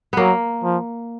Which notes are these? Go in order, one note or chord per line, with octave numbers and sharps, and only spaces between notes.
F#3 A#3 B3
F3